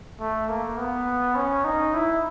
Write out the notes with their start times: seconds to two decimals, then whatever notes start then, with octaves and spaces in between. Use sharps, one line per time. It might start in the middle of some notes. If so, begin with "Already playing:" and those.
0.20 A3
0.48 A#3
0.78 B3
1.35 C#4
1.64 D#4
1.94 E4